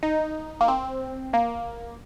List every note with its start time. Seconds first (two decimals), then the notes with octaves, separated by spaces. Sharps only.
0.03 D#4
0.61 A#3
0.68 C4
1.33 A#3